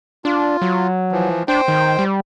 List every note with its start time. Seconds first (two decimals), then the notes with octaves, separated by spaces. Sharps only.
0.25 D4 F4
0.62 F#3
1.12 E3 F3
1.48 D4 C5 G5
1.68 D#3
1.99 G3